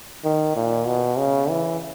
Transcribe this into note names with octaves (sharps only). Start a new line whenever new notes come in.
D#3
A#2
B2
C#3
E3